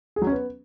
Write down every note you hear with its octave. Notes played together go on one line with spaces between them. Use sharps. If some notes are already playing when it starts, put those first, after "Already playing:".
G#4
F#3
C#4
B3